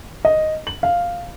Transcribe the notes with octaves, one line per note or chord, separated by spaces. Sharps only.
D#5
F#7
F5